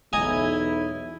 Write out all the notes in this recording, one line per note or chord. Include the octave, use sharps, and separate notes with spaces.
B1 E2 E4 D#5 G#5 A#5